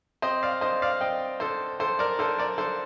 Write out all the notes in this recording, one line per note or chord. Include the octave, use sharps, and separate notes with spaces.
C4 C5 D#5
D5 F5
D3 C5 D#5
D5 F5
C4 D#5 G5
D3 A4 C5
D3 A4 C5
A#4 D5
D3 A4 C5
A#4 D5
D3 A4 C5